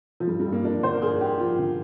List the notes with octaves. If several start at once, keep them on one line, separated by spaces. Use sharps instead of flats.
F3
G2 G3
G3
G2
A#3
F3 D4
D3 C5
A#4
G2 G#4
G2 G4
F3 F4
D3